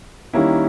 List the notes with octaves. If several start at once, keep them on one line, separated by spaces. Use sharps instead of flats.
D#3 G3 A#3 C#4 E4